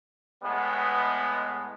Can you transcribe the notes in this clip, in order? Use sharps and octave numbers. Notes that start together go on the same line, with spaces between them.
A2 G#3 B3